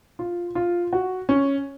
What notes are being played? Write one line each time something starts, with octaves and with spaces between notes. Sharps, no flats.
F4
F4
F#4
C#4